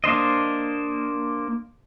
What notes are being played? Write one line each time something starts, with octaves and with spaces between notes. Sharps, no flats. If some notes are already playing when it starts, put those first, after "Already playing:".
A#3 D4 C5 D#5